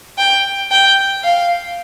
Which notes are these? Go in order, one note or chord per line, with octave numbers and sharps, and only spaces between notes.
G5
G5
F5